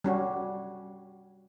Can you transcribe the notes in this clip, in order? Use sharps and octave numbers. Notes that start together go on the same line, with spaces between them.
G3 C#4 F#4